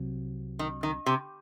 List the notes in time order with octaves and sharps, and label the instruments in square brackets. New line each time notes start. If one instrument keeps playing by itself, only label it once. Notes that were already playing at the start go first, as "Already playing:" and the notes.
Already playing: [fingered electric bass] C2 C3 F#3
[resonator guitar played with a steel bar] D#3
D#3
C3